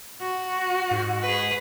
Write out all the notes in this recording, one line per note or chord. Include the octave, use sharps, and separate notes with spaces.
F#4
G#2
G#4 B4